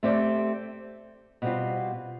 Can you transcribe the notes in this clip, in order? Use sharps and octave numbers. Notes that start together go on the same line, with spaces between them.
A3 C4 G4 D5
B2 G3 C4 F4